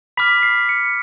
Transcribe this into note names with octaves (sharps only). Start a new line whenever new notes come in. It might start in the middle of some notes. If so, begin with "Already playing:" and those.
B5 D6 F6 B6
C7
C#7